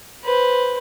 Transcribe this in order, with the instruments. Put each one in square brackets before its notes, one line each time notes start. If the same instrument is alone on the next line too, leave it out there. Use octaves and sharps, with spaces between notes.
[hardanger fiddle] B4 C5